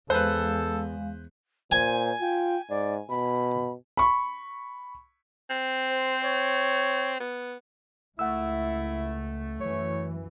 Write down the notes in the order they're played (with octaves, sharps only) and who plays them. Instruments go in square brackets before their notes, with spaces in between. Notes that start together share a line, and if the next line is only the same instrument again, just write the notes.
[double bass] E2 [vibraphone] G#3 F5 [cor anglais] A4 [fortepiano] B4 C5
[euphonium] A#2 [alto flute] C5 [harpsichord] G#5
[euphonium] F4 [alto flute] G5
[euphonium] G#2 [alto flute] D5
[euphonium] B2 [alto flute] B5
[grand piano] B5 C#6
[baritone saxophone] C4
[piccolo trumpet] C5
C#5
[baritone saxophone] B3
[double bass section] C#2 [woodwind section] A3 [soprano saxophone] E4 [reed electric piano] F#5 E6
[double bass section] F#2 E3 [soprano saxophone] C#5